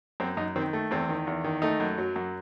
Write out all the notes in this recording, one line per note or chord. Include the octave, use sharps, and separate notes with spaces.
F#2 C4
F#2 D#4
D#3 C4
A3
E2 C4
D#3
E2
D#3
A3 D#4
F#2
F#3
F#2